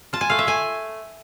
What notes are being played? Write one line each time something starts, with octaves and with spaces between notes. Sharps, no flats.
F4 A5
G#5
A3 F5
E5
A3 G#5